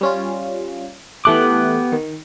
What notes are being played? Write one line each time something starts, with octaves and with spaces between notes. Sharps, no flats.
G3 C#4 F4
E3 A3 B3 G4 D6 F#6
D#3